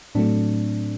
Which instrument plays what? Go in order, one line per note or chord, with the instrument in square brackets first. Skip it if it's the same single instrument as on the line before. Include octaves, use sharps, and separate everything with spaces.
[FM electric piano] A2 F#3 A3 [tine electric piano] C4 D4